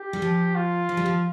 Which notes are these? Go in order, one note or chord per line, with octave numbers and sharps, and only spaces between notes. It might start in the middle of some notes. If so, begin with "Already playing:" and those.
Already playing: G4
G3
F3
F4
F3
G3
F3